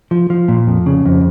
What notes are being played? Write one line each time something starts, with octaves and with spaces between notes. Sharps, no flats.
F3
F3
A#2
F2
C#3
F2